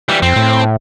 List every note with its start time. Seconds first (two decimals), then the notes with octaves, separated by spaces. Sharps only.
0.09 E3 G3
0.22 F2 C4
0.36 A2